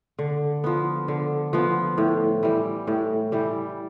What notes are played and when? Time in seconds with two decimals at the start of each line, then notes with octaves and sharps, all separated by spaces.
0.19 D3
0.64 F3 B3
1.08 D3
1.53 F3 B3
1.98 A2
2.43 E3 G3
2.87 A2
3.32 E3 G3